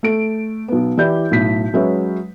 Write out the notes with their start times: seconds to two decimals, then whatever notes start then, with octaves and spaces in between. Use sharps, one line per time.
0.03 A3 A4 D7
0.68 B1 B3
0.97 E3 E4 G4 D5 G6
1.31 B1 A2 B6
1.73 F#3 G#3 C#4 B4 C#5 E5